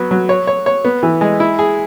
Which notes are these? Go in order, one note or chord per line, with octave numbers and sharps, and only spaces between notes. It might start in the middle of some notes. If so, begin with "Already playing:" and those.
Already playing: F#3 B3
F#3
C#5
C#5
C#5
B3
E3
G#3
E4
G#4